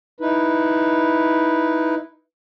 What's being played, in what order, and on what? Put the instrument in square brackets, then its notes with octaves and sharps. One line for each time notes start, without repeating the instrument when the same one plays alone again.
[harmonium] D#4 E4 B4